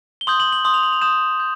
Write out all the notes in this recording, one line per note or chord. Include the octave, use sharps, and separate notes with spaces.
G7
C6 D#6 G6 F#7
F#7
F#7
C6 D#6 G6 F#7
F7
F#7
F7
C6 D#6 G6 E7
G6